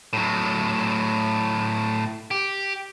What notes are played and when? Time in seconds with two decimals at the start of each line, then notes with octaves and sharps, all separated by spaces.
0.13 A2 F#3
2.31 G4